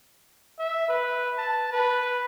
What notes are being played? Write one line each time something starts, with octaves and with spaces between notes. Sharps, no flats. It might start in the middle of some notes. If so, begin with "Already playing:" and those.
E5
B4
A5
B4